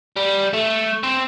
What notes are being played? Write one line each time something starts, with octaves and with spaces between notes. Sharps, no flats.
G3
A3
C4